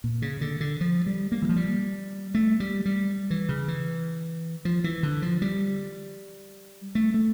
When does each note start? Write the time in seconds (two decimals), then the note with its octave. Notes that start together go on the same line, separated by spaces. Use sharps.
0.04 A#2
0.22 C#3
0.41 D3
0.60 D3
0.81 F3
1.06 G3
1.32 A#3
1.42 E3
1.49 F3
1.56 G3
2.34 A3
2.60 G3
2.86 G3
3.30 E3
3.49 C#3
3.68 E3
4.65 F3
4.84 E3
5.03 D3
5.22 F3
5.42 G3
6.95 A3
7.14 A3